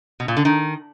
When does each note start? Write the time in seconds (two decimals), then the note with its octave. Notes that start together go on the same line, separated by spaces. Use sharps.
0.20 B2
0.28 A#2
0.37 D3
0.45 D#3